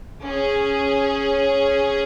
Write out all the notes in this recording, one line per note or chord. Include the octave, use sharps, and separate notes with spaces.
C#4 G#4